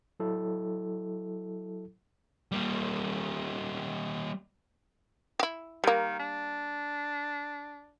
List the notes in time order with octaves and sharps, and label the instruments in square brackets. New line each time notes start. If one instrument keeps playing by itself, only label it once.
[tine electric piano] F#3 E4 A4
[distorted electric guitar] G3 A#3
[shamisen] E4 G4
[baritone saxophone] D#3 [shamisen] G3 A#3
[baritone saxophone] D4